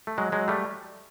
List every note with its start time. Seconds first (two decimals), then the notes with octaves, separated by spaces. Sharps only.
0.07 A3
0.18 F#3 G#3
0.32 F#3 G#3
0.48 G3 A3